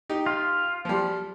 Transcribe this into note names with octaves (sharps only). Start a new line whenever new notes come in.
D#4 G4
F4
F3 G3